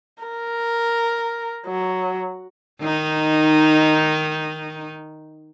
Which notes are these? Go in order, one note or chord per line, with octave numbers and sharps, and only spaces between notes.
A#4
F#3
D#3 D#4